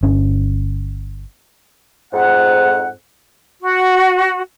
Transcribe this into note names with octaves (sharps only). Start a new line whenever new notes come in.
G1 C#4
F2 G#2 F#5
F#4